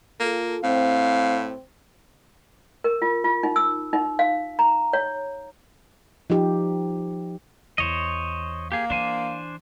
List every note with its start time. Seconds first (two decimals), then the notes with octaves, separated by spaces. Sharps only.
0.20 A#3 F4 A4
0.63 A2 C4 F5
2.84 A#4
3.02 F4
3.24 F4
3.43 D#4
3.56 E6
3.93 D#4
4.19 F5
4.59 A#5
4.93 C#5
6.30 F3 D#4 G4
7.78 E2 C5 C#5 D#5
8.72 A#3 G4 G#4
8.90 E3 D4 C5 G#5